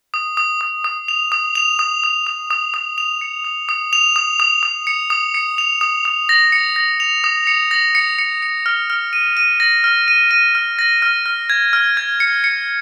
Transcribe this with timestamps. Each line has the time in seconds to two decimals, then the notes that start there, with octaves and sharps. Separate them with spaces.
0.14 D#6
0.37 D#6
0.61 D#6
0.84 D#6
1.08 F7
1.32 D#6
1.55 F7
1.79 D#6
2.04 D#6
2.27 D#6
2.51 D#6
2.74 D#6
2.98 F7
3.21 C#7
3.44 D#6
3.69 D#6
3.93 F7
4.16 D#6
4.40 D#6
4.63 D#6
4.87 C#7
5.10 D#6
5.35 C#7
5.58 F7
5.81 D#6
6.05 D#6
6.29 A#6
6.52 C#7
6.76 A#6
7.00 F7
7.24 D#6
7.47 C#7
7.71 A#6
7.95 C#7
8.19 C#7
8.42 C#7
8.66 F6
8.90 F6
9.13 D#7
9.37 D#7
9.60 A#6
9.84 F6
10.08 D#7
10.31 D#7
10.55 F6
10.79 A#6
11.02 F6
11.26 F6
11.50 G#6
11.73 F6
11.97 G#6
12.20 C#7
12.44 C#7